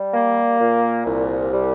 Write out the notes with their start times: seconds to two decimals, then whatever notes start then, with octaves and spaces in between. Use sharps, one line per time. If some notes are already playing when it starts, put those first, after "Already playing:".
Already playing: G3
0.13 A#3
0.60 A#2
1.06 C2
1.53 G3